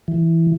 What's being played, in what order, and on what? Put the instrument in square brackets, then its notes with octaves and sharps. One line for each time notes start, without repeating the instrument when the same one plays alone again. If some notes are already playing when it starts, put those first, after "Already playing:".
[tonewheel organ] E3